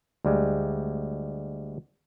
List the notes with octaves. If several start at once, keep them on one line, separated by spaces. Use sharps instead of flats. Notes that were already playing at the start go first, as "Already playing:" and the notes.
D2 G3 G#3